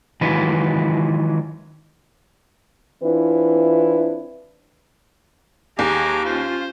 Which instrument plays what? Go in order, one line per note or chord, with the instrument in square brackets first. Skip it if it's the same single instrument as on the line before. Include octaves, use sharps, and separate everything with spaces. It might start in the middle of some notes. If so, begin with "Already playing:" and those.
[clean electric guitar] D#3 E3 F#3 G#3 F4 B4
[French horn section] E3 C4 D4 E4 F4 B4
[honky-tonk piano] D#2 [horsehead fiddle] G#4 A#5 [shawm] D6
[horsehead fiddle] C#4 F4 [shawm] C5